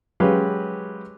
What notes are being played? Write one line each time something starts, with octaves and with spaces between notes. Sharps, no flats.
F#3 G#3 C#4 G4 B4 F5